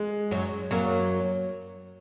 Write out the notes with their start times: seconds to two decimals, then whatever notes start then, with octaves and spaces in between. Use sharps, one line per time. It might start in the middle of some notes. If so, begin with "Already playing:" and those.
Already playing: G#3
0.31 F#2 F#3
0.71 F#2 F#3 A#3